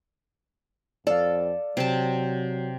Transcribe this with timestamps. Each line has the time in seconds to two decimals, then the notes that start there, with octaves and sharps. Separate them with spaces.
1.07 F2 A4 D5 F5
1.77 C3 F#3 A5